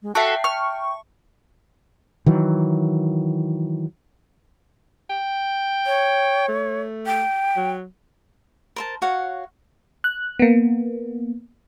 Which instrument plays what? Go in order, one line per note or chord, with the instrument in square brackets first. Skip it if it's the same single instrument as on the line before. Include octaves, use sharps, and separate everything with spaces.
[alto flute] G#3
[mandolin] F#4 A4 [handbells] E5 A5 [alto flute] G5 [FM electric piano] F#6 B6 C7
[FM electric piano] C#6 [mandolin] F6
[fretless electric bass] D#3 E3 F#3
[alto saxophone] G5
[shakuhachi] C#5
[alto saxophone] A3
[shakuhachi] G5
[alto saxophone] F#3
[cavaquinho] A#4 C5 A5
F#4 C#5 F5 F#5
[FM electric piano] F#6
A#3 B3